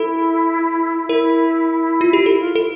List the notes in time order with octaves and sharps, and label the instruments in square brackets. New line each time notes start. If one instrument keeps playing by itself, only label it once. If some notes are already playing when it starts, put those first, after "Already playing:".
Already playing: [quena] E4 [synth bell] A4
[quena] E4 [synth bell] A#4
[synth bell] F4
G4
[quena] E4 [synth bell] A4
[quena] F4
[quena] E4 [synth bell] A4